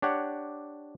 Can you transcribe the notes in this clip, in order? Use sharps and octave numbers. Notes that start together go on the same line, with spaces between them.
D4 G4 C#5 F#5